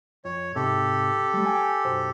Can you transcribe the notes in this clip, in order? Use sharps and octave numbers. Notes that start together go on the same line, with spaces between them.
F2 C#5
G#2 C3 G4 A4
G3 A3
G5 G#5
B1 F#2 C5